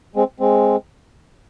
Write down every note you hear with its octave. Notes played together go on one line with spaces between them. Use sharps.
G#3 C4
G#3 C4